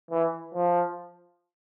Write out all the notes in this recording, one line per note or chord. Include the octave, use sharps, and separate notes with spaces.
E3
F3